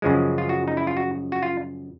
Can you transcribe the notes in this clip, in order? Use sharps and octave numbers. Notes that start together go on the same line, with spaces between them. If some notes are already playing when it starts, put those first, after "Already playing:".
F#2 C#3 F3 G#3
F4
F#4
D#4
E4
F4
F#4
F#4
F4